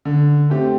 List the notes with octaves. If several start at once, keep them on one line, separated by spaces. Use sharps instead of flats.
D3
A3 C4 G4